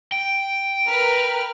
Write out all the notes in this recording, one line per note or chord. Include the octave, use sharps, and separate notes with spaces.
G5
A#4 B4 F6